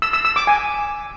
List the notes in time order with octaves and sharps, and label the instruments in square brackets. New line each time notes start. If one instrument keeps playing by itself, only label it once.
[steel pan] E6
E6
E6
D6
G#5